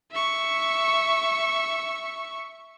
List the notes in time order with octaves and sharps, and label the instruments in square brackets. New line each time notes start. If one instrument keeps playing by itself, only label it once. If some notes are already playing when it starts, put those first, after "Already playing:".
[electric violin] E5 C#6